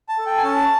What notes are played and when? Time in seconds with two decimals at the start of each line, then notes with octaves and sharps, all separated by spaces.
0.09 A5
0.18 A4
0.26 G5
0.38 G#5
0.43 C#4 A5